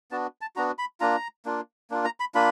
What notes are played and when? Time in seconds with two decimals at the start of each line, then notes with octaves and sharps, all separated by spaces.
0.11 B3 D4 F#4 A5
0.41 A5
0.56 B3 D4 F#4 A#5
0.78 B5
1.00 A#3 D4 F4 A#5
1.46 A#3 D4 F4
1.90 A#3 D4 F4
2.05 A#5
2.20 B5
2.35 A#3 D4 F4 B5